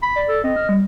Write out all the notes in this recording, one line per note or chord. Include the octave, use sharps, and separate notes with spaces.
B5
D5
A4
C4 D#5
F6
G3